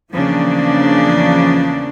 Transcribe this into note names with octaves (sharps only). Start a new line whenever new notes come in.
E2 C#3 F3 A#3 D4